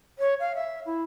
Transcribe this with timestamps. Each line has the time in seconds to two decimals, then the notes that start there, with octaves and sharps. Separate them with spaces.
0.18 C#5
0.39 F5
0.55 E5
0.85 E4